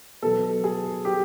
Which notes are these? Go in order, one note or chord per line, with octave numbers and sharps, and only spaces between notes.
B2 F#3 A4
G#4
G4